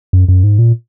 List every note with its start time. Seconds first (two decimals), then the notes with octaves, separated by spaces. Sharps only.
0.13 F#2
0.28 F#2
0.43 G#2
0.59 A#2